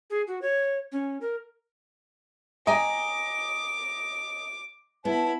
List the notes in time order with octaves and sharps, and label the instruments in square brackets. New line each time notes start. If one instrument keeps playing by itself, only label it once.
[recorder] G#4
F#4
C#5
C#4
A#4
[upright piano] D#5 A#5 [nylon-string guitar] G5 G#5 [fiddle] D6
[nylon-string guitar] B3 [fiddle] E4 B5 [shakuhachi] A5